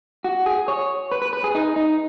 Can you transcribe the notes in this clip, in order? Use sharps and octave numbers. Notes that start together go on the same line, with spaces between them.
F#4
G#4
C#5
B4
B4
B4
G#4
D#4
D#4